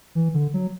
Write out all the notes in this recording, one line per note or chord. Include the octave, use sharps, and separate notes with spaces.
E3
D3
F#3